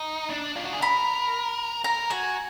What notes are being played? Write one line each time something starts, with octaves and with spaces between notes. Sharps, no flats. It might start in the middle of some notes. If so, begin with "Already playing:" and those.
Already playing: D#4
D4
F4
F#4
G#4
A#4 B5
A#4 A#5
F#4 G#5